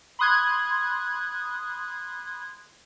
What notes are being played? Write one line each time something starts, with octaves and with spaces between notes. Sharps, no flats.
B5 C6 D#6 F#6 G#6